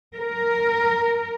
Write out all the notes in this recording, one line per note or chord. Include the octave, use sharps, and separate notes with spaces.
A#4